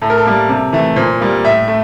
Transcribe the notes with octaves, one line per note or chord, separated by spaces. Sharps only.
A2 A4
A#4
A4
G3 A#3
C3
E3 A3
A#2 C5
G3 A#3
A2 E5
A3